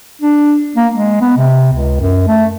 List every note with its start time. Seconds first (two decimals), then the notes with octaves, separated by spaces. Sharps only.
0.22 D4
0.76 A#3
0.94 G#3
1.21 B3
1.37 C3
1.73 C#2
2.00 F#2
2.27 A3